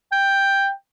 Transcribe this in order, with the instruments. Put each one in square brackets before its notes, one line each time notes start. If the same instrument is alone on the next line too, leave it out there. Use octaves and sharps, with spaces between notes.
[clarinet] G5